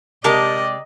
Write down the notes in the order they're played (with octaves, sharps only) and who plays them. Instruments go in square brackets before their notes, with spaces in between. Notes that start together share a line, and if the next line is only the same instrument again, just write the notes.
[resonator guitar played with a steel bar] C3 G#3 G4 [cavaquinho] A#4 A5 [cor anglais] D5 [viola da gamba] D#5